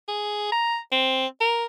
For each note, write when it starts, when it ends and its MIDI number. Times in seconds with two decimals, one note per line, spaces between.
0.08 0.49 68
0.52 0.78 82
0.92 1.26 60
1.41 1.65 70